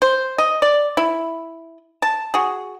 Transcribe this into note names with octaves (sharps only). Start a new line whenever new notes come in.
C5
D#5
D5
E4
A5
F#4 G#4